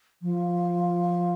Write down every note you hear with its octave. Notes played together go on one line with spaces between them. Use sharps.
F3